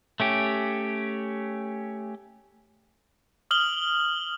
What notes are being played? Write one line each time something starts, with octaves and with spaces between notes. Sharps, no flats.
A3 C#4 G4
D#6 F6 F#7 G7